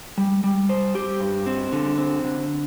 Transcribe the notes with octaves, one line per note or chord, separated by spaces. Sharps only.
G3
G3
C5
G4
G2
C4
D3
C4
D3